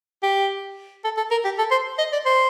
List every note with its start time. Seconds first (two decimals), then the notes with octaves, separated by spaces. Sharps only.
0.23 G4
1.05 A4
1.17 A4
1.31 A#4
1.45 G4
1.59 A4
1.71 C5
1.99 D#5
2.13 D5
2.26 C5